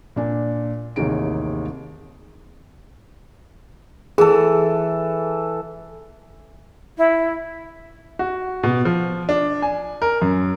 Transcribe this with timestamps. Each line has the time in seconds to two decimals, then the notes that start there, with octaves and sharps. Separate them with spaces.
0.16 A#2 D4 G#5
0.96 A1 D#2 C3 D#4 G#4 D7
4.18 E3 G#4 A4
6.97 E4
8.19 F#4
8.63 B2
8.85 F3
9.29 D4
9.62 G#5
10.02 A#4
10.22 F#2